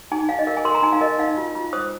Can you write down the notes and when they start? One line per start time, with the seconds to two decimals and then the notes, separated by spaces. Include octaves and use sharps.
0.12 D#4 G#5
0.29 D#4 F5
0.39 D#5
0.47 A#4 F5
0.57 G#5
0.65 A#4 C6
0.75 A#5
0.83 D#4 G#5
0.93 F5
1.01 A#4 D#5
1.19 D#4 F5
1.37 F4
1.55 F4
1.73 C5 D#6